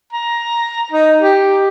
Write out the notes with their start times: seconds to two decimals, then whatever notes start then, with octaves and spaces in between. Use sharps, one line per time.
0.13 A#5
0.92 D#4
1.22 G4